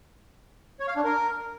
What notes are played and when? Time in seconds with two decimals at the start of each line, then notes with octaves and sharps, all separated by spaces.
0.80 C#5
0.88 F5
0.96 D4
1.04 A#4